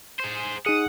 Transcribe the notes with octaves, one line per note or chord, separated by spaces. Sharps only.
G#4 C5
D#4 G#4 F#5 D#6